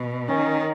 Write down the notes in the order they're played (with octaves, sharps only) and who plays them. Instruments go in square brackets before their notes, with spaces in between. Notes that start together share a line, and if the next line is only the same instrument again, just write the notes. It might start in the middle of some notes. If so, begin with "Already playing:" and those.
Already playing: [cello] B2
[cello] D#3 [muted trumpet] C#4